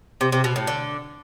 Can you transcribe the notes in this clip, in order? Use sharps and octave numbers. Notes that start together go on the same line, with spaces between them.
C3
C3
B2
A2
D3